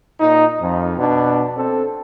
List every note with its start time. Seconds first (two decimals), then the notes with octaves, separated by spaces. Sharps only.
0.20 A#2 D#4
0.60 F2
0.98 B2 D4
1.56 C4 A4